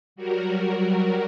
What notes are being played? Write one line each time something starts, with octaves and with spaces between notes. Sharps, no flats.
F#3 G3 F#4 A#4